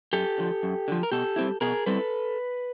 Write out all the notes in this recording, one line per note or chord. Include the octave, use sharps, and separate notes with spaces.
F#2 G4 A4
D3 F3
F#2
D3 F3
A#4
B2 G4 A4
G3 C4 E4
B2 G#4 A#4
G3 C4 E4 A4 B4